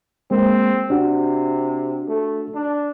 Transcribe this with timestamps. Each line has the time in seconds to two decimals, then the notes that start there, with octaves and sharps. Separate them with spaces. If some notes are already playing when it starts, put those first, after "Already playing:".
0.31 G#3 A#3 C4
0.90 C3 D4 F#4
2.08 A3
2.54 D4